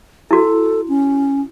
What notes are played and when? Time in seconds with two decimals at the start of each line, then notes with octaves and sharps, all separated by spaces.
0.31 E4 F#4 A4
0.88 C#4